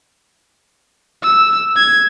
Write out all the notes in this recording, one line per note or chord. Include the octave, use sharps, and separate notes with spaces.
E6
G#6